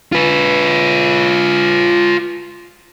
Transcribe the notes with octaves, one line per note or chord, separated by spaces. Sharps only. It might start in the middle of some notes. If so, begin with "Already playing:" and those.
F4 B4